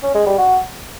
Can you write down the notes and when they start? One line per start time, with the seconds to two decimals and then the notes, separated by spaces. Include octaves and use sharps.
0.03 C#4
0.15 G#3
0.27 G3
0.38 F#4